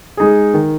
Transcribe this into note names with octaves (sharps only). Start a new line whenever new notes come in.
G#3 D#4 G#4
D#3